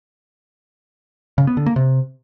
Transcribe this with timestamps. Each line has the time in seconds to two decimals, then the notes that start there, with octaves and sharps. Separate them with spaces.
1.38 C#3
1.47 B3
1.57 D3
1.66 A#3
1.76 C3